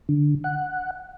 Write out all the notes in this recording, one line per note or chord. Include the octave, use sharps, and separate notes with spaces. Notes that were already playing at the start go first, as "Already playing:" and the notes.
D3
F#5